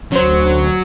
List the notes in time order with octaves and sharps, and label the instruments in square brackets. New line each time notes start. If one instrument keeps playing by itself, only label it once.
[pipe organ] D2 [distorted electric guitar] F#3 [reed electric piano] C#4 C5